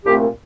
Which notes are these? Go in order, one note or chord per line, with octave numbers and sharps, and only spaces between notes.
C2 A#2 A3 C4 G4